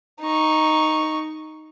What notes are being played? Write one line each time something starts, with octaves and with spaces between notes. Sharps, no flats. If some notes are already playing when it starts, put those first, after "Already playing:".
D#4 C#6